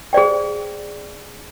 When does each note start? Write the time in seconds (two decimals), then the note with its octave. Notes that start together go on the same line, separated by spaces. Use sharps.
0.13 G#4 C5 D5 G5